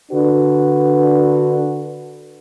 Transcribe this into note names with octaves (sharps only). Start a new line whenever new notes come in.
D3 D4 F#4 B4